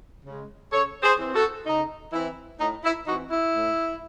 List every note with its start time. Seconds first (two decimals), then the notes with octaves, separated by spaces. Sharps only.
0.25 C#3 G#3
0.72 C#3 A4 C#5
1.03 G#4 C5
1.19 E3 C4
1.34 F#4 A4
1.66 C#3 D#4
2.13 E3 C4 E4
2.60 A2 D#4
2.84 E4
3.07 E3 D#4 F#4
3.10 C4
3.30 E4
3.54 A2